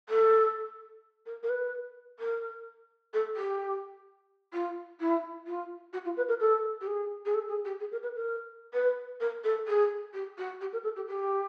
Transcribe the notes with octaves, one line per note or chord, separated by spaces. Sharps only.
A4
A#4
A#4
B4
A#4
A4
G4
F4
E4
F4
F#4
F4
B4
A#4
A4
G4
G#4
G#4
A4
G#4
G4
G#4
A#4
B4
A#4
B4
A#4
A4
G#4
G4
F#4
G4
A#4
A4
G4
G4